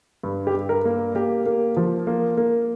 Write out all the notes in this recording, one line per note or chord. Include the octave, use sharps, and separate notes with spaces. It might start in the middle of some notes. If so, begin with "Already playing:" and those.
G2
G4
G2
A#4
A#3
A#3 G4
A#3
F3
A#3
A#3